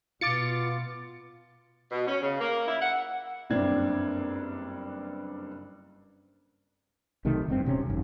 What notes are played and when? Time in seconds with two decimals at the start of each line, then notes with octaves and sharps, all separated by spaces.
0.21 B2 B3 F4 D6 A6 C#7
1.91 B2
2.07 C#4
2.22 C#3
2.39 A#3
2.68 E4
2.81 F#5
3.50 F#1 G2 A#3 C4 D4 G#6
7.25 B1 C3 D#3 A3
7.48 F#1 G2 C4
7.65 D#1 C3 C4 C#4
7.86 G#1 F#2